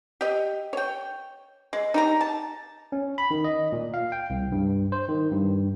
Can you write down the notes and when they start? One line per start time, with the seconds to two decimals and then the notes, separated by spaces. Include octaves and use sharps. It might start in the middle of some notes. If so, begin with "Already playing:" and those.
0.21 G4 D#5
0.73 C#5 G5
1.73 G#3
1.94 D#4 G4 A#5
2.21 A5
2.92 C#4
3.18 B5
3.31 D#3
3.44 D#5
3.72 A#2
3.94 F5
4.12 G5
4.30 C2
4.52 G2
4.92 C5
5.09 D#3
5.31 G2